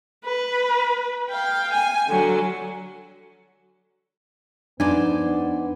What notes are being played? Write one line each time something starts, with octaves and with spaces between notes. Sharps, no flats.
B4
F5 G5
G#5
D3 F#3
F2 B3 D4 D#4 C5 D5 G#5